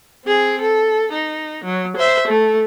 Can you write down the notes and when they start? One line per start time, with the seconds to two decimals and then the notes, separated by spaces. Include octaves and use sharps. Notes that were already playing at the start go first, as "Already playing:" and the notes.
0.25 C4 G#4
0.61 A4
1.13 D#4
1.65 F#3
1.97 C5 E5
2.28 A3 A4